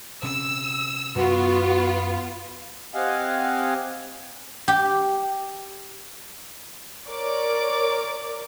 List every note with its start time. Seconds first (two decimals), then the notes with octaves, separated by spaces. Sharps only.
0.23 C3 C#4 E6
1.16 F#2 B3 F4 F#4
2.94 C4 G4 D#5 F5 F#5 G#5
4.68 G4
7.09 A#4 C#5 D5 D6